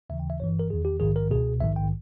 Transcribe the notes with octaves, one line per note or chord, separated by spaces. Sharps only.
D#2 C#3 E3 E5
G5
E5
G1 G2 E3 C#5
A#4
E2 D#3 G#4
G4
A#1 G#2 D#3 G#4
A#4
C#2 B2 G#4
A#1 G#2 D#3 E5
G5